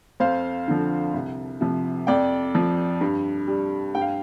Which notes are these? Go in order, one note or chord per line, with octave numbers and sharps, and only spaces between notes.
F2 C5 F5
D3 F3
C2
C3 F3
F2 D5 G5
F3
G2
G3
G2 G5
F5